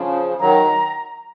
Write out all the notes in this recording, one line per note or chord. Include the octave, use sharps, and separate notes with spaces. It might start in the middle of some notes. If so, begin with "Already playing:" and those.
Already playing: C#3 F3
D#3 F#3 A#5
F#3